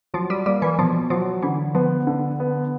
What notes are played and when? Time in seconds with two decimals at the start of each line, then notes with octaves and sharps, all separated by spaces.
0.13 F3 F#3
0.30 G3
0.46 G3 A#3
0.62 E3
0.78 B2 F3
1.10 F3 F#3
1.43 D3 E3
1.75 F3 B3
2.07 D3
2.40 B3